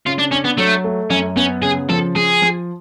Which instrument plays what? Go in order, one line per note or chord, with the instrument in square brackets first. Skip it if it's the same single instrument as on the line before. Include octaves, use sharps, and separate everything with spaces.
[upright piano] C#3 [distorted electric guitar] F4
[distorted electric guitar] D4
[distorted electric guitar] C#4 [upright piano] D4
[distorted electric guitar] B3
[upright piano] F#3 [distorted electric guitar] A3
[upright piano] A3
[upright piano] F#2 [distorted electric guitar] C#4
[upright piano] B3 [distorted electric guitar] C#4
[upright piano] C#3 [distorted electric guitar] G#4
[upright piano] F3 [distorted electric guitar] A4
[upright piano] F3 [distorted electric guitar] G#4
[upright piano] F3